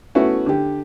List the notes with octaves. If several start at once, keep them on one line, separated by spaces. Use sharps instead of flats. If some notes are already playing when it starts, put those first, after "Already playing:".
A3 B3 C#4 E4 F#4
D3 G4